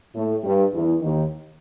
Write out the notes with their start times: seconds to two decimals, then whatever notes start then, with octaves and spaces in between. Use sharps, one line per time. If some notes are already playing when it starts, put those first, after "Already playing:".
0.15 A2 A3
0.44 G2 G3
0.74 E2 E3
1.02 D#2 D#3